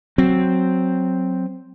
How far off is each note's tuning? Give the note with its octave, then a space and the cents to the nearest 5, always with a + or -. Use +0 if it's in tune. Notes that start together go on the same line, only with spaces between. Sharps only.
F#3 +0 C4 +0